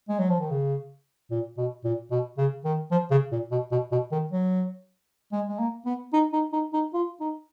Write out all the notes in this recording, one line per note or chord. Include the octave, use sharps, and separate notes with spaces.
G#3
F#3
F3
D#3
C#3
A#2
B2
A#2
B2
C#3
D#3
F3
C#3
A#2
B2
B2
B2
D#3
F#3
G#3
G#3
A#3
B3
D#4
D#4
D#4
D#4
F4
D#4